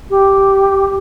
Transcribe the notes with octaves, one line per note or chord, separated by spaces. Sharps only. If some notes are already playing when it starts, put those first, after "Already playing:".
G4